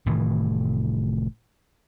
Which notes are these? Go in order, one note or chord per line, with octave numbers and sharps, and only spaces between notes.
F1 A2 D#3 E3